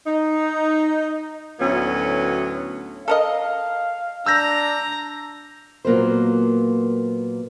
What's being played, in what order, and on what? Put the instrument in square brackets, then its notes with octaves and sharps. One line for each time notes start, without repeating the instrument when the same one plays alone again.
[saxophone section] D#4
D2 A2 F#3 B3 C#4
[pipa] A4 A#4 D#5 [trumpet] F5
[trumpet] D4 [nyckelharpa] A#5 [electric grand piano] E6 G6 A#6
[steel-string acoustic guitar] A#2 F#3 A#3 B3 C5